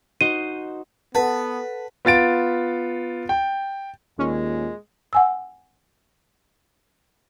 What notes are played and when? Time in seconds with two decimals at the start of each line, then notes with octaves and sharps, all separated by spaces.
0.21 D#4 F#4 C5 D#7
1.15 B3 A4 B4 F#5 A5
2.05 B3 F4 A6 D7
3.29 G5
4.19 D#2 A#2 G#3 C#4
5.13 F#5 G#5 E6